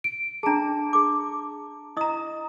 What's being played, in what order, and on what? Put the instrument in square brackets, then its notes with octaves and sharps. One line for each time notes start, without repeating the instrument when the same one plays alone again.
[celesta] D7
[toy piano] D4 G#4 [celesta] A5 A#5
[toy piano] G#4 D6
[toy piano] E4 D#6 [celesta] D#5 A#5